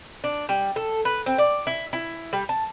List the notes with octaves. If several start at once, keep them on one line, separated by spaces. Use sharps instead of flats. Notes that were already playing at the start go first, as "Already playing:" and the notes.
D4
G3
A4
B4
C4
D5
E4
E4
G3
A5